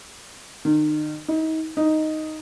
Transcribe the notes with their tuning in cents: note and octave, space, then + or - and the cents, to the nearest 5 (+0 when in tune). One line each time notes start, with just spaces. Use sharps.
D#3 -40
D#4 +35
D#4 +0